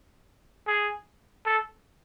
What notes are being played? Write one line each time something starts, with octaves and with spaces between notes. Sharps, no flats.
G#4
A4